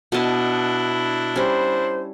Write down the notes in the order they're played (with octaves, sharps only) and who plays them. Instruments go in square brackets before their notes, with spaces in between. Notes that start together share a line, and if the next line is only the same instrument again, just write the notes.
[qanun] B2 D#5 A5 [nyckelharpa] D4 E4
[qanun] G3 C#4 [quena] C5